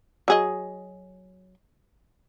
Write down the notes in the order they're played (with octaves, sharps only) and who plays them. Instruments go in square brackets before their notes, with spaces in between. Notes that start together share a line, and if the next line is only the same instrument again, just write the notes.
[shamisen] F#3 G#4 D#5